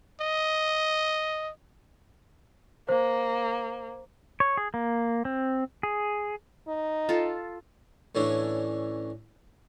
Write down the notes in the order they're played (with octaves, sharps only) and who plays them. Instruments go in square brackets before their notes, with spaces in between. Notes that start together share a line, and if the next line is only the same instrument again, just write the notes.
[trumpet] D#5
[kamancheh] A#3 [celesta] C5
[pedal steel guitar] C#5
G#4
A#3
C4
G#4
[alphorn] D#4
[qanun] F4 A4
[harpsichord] A2 E3 C#4 D4